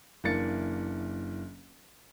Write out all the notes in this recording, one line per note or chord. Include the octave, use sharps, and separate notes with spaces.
F#1 E3 A#3 D4 A6 C#7